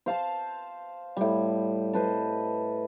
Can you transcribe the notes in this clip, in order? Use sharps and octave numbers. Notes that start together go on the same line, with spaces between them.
C5 F5 A5 C6
A2 G3
A4 B4 C5 D#5